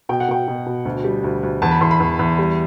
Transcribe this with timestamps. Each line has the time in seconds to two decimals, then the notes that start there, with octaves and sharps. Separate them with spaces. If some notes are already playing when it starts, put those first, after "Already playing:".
0.09 B2 G5
0.20 F#5
0.28 B2 G5
0.48 B2
0.66 B2
0.85 D2
1.04 G3
1.24 D2
1.43 D2
1.62 E2 A5
1.71 B5
1.81 E2 C6
1.91 B5
2.00 E2
2.19 E2
2.39 G3